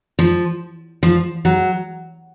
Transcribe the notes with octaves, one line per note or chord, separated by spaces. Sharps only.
F3
F3
F#3